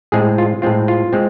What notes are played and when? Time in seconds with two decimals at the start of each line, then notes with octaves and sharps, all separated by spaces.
0.12 A2 G#3 C4 G#4
0.38 F4
0.62 A2 G#3 C4 F4
0.88 F4
1.13 G#3 C4